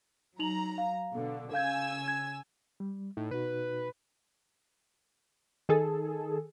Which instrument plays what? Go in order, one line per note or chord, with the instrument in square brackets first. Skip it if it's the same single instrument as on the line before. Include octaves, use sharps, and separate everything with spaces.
[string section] F#3 A#5 [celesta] D#4 F7 F#7
[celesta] F5
[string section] B2 D3
[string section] C#3 G#5 E6 [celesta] F5 G6 G#6
[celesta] G#6
[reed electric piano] G3
[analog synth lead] A2 [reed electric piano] D#4
[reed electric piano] B2 D#4 F#4 [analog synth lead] B4
[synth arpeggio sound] D#3 G#4 A4